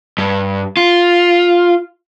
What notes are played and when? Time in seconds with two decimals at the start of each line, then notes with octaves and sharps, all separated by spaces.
0.18 G2
0.77 F4